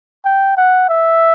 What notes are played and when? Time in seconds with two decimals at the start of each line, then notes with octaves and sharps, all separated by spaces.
0.25 G5
0.57 F#5
0.89 E5